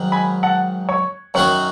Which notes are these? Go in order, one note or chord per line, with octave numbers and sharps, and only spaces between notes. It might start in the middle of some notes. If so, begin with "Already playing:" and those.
Already playing: G#2 D#3 F#3
G#5 B5
F#5 A5
C#5
F#2 D#3 F#3 C#4 F#4 C#5